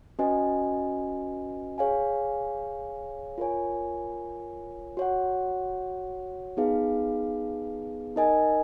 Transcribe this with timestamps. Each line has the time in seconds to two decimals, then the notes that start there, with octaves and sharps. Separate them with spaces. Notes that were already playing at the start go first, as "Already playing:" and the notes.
0.19 C#4 F#4 B4 D#5 G#5
1.78 G#4 C#5 F5 G#5
3.38 F4 A#4 C#5 G#5
4.97 F#4 C#5 F#5
6.57 B3 D#4 G#4 B4 F5
8.16 D#4 A#4 D#5 G#5